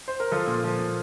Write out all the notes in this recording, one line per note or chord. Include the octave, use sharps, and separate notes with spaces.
C5
A#4
F3 F4 A4
A#2
F3
A#2